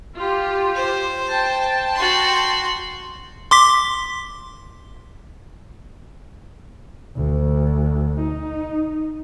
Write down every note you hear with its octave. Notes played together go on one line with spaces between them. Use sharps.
F4 G4
C5
G5 A5
F#4 C6
C6 D6 B6
D2
D#4